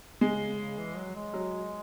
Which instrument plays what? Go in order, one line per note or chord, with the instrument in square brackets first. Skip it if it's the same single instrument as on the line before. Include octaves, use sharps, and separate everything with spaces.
[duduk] C#3 [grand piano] G#3
[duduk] C#3
E3
F#3
G#3
[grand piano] F#3